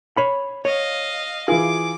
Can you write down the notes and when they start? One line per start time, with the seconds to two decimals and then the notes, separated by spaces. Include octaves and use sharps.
0.17 C#5 B5
0.65 C#5 D#5 F5
1.48 E3 F4 G#4 D6